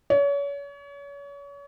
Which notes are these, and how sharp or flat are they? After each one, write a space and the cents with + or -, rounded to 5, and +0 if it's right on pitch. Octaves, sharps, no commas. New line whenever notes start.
C#5 +35